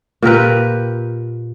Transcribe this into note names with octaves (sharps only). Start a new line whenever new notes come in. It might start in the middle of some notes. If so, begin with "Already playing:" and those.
A#2 G4 A#4 B4